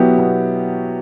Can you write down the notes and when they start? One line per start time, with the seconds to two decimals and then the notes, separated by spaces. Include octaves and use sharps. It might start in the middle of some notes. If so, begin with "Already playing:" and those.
Already playing: B2 F#3 B3 E4 G4
0.18 B2